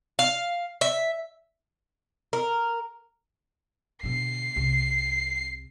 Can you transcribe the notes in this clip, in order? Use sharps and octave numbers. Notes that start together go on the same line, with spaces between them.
F5
E5
A#4
B2 D3 C7
C2 C3